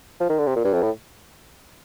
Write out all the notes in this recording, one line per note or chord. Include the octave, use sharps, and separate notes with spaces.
F3
D#3
D3
C3
A#2
G2
F2
A2